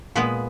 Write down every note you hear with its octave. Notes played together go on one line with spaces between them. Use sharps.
A#2 G#3 B3 B4